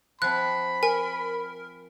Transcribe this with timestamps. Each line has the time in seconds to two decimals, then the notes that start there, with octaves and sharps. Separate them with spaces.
0.22 F3 C4 B5 F#6
0.83 A#4 G#5